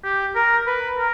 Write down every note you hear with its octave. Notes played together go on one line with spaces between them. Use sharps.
G4
A#4
B4
A#4